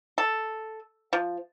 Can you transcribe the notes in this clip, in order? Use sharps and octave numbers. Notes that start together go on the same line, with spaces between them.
A4
F3